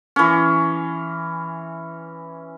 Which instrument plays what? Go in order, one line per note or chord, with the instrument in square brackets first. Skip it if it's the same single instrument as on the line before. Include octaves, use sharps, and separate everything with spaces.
[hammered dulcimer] E3 C#4